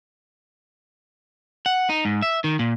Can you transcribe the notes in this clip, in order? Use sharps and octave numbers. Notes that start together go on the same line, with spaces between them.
F#5
D#4
G#2
E5
D#3
A#2